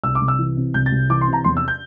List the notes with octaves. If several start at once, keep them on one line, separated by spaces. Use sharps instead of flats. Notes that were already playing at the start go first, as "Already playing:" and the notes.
C2 E6
D6
C2
E6
E3
C3
C2 G6
A6
C2
E3 D6
C6
C3
A#5
E2 C6
E6
G6